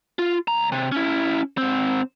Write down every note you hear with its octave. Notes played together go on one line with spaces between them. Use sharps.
F4
C#2 A#5
C3
C#4 E4
G#2 C4